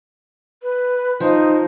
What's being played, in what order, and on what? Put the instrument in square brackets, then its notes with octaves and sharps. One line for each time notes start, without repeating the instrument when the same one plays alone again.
[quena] B4
[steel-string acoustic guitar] F3 [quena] D#4